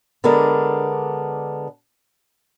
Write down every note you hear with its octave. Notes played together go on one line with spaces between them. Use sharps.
D3 G#3 B3 D4 A#4